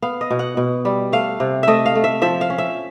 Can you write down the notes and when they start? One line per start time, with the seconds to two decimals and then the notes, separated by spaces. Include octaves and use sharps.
0.02 B3 F5
0.21 D#5
0.30 B2
0.39 F#5
0.57 B2
0.85 G3
1.12 A3 F5
1.40 C3
1.63 A3 D#5 E5
1.86 F5
1.95 A3
2.04 E5
2.22 F3 E5
2.41 F5
2.50 C#4
2.58 E5